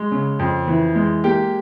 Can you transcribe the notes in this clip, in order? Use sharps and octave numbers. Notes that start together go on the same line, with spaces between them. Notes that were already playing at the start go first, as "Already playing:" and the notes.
Already playing: G#3
C#3
F2
E3
G#3
A#3 G4 G5